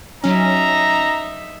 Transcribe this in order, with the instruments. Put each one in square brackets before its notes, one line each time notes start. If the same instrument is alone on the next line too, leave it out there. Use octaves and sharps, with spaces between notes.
[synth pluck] F#3 C#4 [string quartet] D#4 E5 [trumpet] A#5